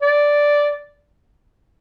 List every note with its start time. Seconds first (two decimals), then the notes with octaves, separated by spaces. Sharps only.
0.02 D5